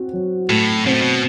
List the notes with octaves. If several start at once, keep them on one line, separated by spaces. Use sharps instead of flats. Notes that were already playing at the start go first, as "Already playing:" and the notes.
Already playing: C4 F#4
F#3
A2 A3
B2 C4
A2
B2